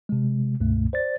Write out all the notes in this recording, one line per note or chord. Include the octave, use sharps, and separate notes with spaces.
C3 G#3
C#2 G2 B2 A3
C5 D5 A6